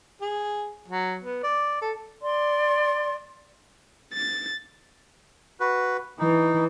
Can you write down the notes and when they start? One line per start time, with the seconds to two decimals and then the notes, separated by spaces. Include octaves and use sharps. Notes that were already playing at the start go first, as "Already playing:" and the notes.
0.22 G#4
0.88 F#3
1.22 B3
1.43 D5
1.81 A4
2.22 D5 C6
4.14 A6
5.60 F#4 B4
6.19 E3 D#4